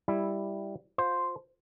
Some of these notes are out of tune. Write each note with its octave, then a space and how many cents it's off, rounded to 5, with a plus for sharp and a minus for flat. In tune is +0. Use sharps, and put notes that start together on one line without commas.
G3 +5 E4 +0
F4 +25 C5 +0